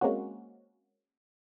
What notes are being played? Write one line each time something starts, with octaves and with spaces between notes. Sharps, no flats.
G#3 A#3 C4 C#4 F#4